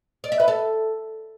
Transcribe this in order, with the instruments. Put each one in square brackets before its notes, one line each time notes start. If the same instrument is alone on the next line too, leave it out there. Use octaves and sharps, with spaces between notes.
[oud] D5
E5
B4
A4